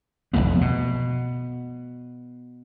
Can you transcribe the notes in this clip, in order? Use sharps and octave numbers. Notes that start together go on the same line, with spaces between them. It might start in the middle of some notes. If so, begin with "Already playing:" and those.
F1 E2 A3 B3
B2